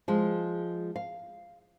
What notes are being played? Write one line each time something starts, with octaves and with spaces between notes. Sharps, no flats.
F3 G#3
F5